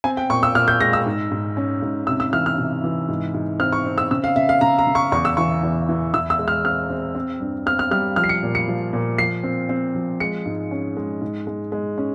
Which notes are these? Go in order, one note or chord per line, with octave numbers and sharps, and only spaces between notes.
C4 G#5
G5
A#2 C#6
E6
A#2 F6
G6
G#3 A#6
E6
G#2
G#2
C#4
G#2
C3 E6
E6
E3 F6
F6
C3
E3
G#2
G#2
C4 F6
C#6
C4
E6
C#3 E6
F5
C#3 E5
F5
C#3 A#5
A#5
C#3
C#6
E2 C#6
E6
E3 C#6
E2
E3
E3 E6
E6
G#3
F6
C4 F6
C4
C4
G2
C4 F6
F6
G3 F6
F3 F6
C7
C#7
A#2
C#7
F3
A#2
F3 C7
C4
C4
F3
G#3 C#7
G#2
C#4
G#3
G#2
G#3
G#3
C#4